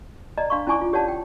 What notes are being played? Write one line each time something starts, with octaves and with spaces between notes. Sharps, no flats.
D5 D#5 A#5
D4 F5 C6 C#6
C#4 E4 D5 G#5 C#6 D6
F4
G4 C#5 D5 F#5 A5
G5